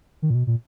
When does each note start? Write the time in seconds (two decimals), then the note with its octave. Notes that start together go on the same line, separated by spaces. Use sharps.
0.22 D#3
0.30 A#2
0.35 B2
0.47 A#2